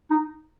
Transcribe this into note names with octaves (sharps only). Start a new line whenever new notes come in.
D#4